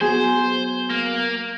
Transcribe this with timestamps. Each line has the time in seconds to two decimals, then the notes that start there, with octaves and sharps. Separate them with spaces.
0.01 F#3 B3 F#4 G#4 C5
0.90 A#3